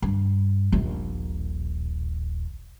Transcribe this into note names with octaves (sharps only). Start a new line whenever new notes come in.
G2
D#1 A#1